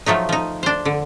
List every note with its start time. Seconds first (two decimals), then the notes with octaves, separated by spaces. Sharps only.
0.06 F3 F#3 A3 D#4
0.29 F3 D#4
0.63 D4 C5
0.85 D3